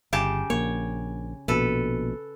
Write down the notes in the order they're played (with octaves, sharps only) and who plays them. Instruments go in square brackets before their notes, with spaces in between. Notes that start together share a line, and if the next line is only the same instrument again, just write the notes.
[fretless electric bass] G1 [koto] C#3 G4 A5
[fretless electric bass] A#1 A#3 [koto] C#5
[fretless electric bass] A#1 B2 [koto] A4 B4